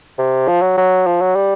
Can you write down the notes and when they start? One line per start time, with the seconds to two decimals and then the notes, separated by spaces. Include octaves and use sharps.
0.18 C3
0.48 F3
0.62 F#3
0.77 F#3
1.06 F3
1.21 F#3
1.36 G3